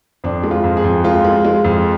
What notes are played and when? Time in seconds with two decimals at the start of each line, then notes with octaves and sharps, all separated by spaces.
0.24 F2 D4
0.43 G#3
0.51 F4
0.64 F2
0.77 G#4
0.84 F2
1.04 G#3 F4
1.24 G#3
1.45 G#3
1.64 F2